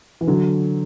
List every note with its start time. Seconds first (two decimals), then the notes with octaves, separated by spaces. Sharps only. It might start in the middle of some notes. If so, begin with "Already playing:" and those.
0.21 E3
0.27 D3 F#3